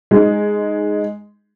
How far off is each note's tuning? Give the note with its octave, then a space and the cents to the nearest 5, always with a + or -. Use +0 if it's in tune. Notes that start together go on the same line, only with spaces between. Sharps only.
G#3 +0 D#4 +0